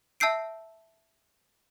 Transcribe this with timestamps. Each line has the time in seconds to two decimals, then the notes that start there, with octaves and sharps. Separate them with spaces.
0.20 E5 A5 E6 G6 C7 D7